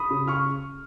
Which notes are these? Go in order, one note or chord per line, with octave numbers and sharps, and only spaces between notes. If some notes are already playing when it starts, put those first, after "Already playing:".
Already playing: B5 D#6
C#3
C#6 F6